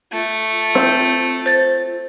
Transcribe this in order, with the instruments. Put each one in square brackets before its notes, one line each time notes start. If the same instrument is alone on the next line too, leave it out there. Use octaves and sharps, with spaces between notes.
[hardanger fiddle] A3 [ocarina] F4
[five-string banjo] C4
[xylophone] C5 A6